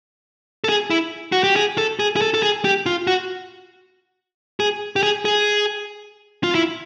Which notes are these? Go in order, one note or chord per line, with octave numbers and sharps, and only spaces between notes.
A4
G#4
E4
F#4
G4
G#4
A4
G#4
G#4
A4
A4
G#4
G4
F4
F#4
G#4
G4
G#4
G#4
F4
E4